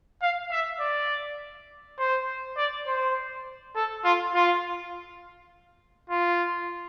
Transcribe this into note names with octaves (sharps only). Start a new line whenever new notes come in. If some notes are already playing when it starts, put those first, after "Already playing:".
F5
E5
D5
C5
D5
C5
A4
F4
F4
F4